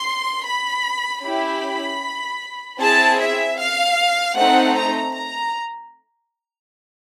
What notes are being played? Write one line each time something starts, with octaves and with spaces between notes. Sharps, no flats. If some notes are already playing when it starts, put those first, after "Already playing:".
Already playing: C6
B5
C#4 E4 G4 B5
C4 E4 G#4 A5
E5
F5
A3 C4 D#4 F#5
A#5
A#5